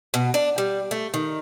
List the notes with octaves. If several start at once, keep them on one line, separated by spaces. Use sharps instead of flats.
B2
D4
G3
A3
D#3